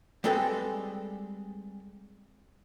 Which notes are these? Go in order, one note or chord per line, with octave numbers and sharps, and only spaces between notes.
G3 G#3 C4 A4 B4 G5